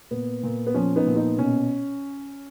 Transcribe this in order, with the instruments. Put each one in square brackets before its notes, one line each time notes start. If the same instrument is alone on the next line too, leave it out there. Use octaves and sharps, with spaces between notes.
[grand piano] A#2 B3
A#2
B3
F3 C#4
B3 D#4
A#2
B3 D#4
B2 C#4